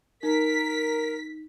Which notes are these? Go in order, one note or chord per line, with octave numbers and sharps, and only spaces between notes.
D#4 A#4 B6